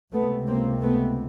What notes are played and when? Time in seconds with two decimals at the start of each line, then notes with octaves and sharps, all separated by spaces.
0.13 C#2 C3 A3 B3
0.47 A#3 C4
0.82 A3 B3